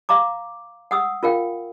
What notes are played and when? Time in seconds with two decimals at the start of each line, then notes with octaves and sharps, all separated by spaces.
0.09 E5 F5 A#5 D6
0.91 F#5 D#6 E6
1.23 F4 A#4 F5 G5